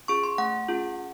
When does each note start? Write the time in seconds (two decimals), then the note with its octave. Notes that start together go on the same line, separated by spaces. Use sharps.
0.08 C#4 F4 G#4 C#6
0.23 C6
0.38 A3 F#5
0.69 C#4 F4 G#4